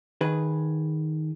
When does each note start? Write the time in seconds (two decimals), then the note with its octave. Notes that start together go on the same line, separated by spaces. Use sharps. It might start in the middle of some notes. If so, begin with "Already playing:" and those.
0.21 D#3 G#4 B4